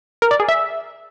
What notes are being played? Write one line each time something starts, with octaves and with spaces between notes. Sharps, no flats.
A#4
D5
G#4
E5